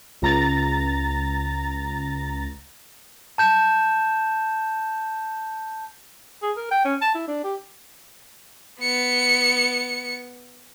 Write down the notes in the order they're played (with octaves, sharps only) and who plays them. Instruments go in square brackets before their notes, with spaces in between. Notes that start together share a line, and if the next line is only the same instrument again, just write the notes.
[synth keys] C#2 A#5 A6
[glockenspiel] A5 G6 E7
[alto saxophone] G#4
A#4
G5
C#4
A5
E4
D4
G4
[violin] B3 C#7